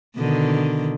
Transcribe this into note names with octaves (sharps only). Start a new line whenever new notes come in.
B2 D3 D#3